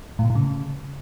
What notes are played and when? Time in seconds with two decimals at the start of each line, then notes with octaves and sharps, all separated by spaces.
0.19 A2
0.24 B2
0.30 A2
0.35 C#3